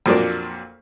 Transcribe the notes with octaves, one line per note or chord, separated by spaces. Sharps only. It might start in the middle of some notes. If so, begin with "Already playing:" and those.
F2 A#2 F#3 A#3 D4